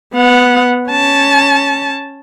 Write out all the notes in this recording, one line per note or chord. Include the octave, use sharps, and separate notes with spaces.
B3 F#5
C#4 A5